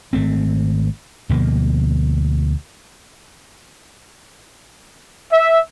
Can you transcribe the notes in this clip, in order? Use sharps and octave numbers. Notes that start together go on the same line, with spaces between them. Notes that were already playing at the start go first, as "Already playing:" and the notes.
G#1 A3 C4
D2 B2 F3 A#3
E5